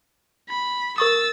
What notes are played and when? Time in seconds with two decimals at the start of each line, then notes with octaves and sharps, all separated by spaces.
0.49 B5
0.98 A#4 C#6 D#6 E6 A6